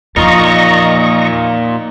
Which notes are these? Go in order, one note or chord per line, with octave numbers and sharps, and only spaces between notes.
E2 A#2 F3 D#4 F4 D#5 A#5 C#6